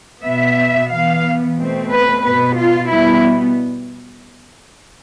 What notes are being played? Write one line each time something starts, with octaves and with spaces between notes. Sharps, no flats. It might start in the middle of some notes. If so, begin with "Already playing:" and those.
B2 B3 E5
E3 B3 F5
B2 A3 C4
B4
B2 B3 B4
F4
B2 G3 B3 E4